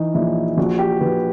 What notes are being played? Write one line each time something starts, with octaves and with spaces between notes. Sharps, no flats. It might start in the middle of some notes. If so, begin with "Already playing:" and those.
Already playing: E3 D#4
A#1 E4
A#1 F#4
G4
A#1 B4